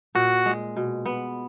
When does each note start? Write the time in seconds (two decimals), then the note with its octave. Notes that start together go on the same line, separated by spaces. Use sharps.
0.15 A#2 F#4
0.46 G#3
0.76 B2
1.06 B3